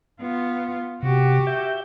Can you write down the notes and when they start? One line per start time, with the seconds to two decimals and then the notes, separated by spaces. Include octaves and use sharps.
0.21 B3 F4
1.03 C3 F#4 G4
1.47 E5 G6